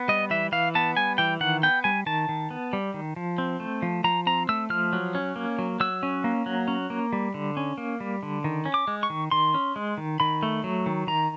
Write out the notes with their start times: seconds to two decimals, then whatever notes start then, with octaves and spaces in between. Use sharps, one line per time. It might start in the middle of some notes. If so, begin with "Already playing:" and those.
Already playing: B3
0.08 G3 D#5
0.30 E3 E5
0.52 E3 F5
0.75 B3 A5
0.97 G3 G#5
1.18 E3 G5
1.41 D#3 F#5
1.63 B3 G5
1.84 G3 G#5
2.06 D#3 A5
2.29 D#3
2.51 B3
2.73 G3
2.94 D#3
3.16 F3
3.38 C4
3.60 A3
3.82 F3
4.04 F3 A#5
4.26 C4 A#5
4.49 A3 E6
4.70 F3 F6
4.93 F#3
5.15 C#4
5.36 A#3
5.59 F#3
5.80 F#3 E6
6.03 C#4
6.24 A#3
6.46 F#3
6.68 C#4
6.90 A#3
7.13 G3
7.34 D3
7.57 C#4
7.78 A#3
8.00 G3
8.23 D3
8.44 D#3
8.66 C#4
8.74 D6
8.87 G#3
9.03 C#6
9.10 D#3
9.31 D#3 C6
9.54 C#4
9.76 G#3
9.98 D#3
10.20 D#3 B5
10.43 A3
10.64 F#3
10.86 D#3
11.07 D#3 A#5